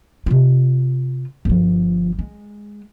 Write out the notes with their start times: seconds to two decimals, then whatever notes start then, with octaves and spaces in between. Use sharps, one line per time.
0.26 C3 F4
1.45 G1 F3
2.19 G#3